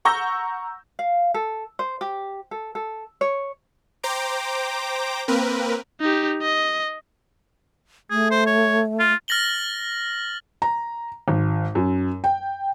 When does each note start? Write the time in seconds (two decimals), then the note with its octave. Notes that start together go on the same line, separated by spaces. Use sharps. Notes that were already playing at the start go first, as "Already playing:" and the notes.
0.05 F#5 A#5 C#6 E6 G6 A#6
0.99 F5
1.34 A4
1.79 C5
2.01 G4
2.51 A4
2.75 A4
3.21 C#5
4.03 C5 G5 A#5 D6
5.28 A#3 C4 A#4 B4
6.00 D#4 G4
6.42 D#5
8.10 A3 G#4
8.31 C5
8.46 C#5
8.99 F4
9.28 F6 A6 A#6 F#7 G7
10.62 A#5
11.28 G#1
11.75 F#2
12.24 G5